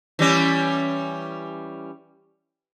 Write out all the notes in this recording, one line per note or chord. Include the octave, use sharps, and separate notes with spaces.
E3 G3 C#4